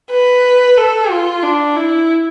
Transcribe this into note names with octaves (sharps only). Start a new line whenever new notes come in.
B4
A4
F4
D4
E4